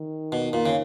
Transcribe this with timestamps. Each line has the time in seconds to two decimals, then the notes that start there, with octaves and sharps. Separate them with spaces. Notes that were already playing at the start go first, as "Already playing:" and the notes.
Already playing: D#3
0.32 B2
0.53 A#2
0.66 C#3